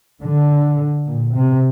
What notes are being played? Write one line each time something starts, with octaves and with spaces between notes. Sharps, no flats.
D3
A#2
C3